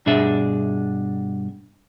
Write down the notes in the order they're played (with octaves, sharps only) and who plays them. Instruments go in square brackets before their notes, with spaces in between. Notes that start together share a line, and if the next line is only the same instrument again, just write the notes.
[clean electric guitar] G2 B2 D4 G#4 E5